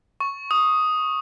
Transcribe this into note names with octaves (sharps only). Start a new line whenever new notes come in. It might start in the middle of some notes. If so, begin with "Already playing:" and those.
C#6
D#6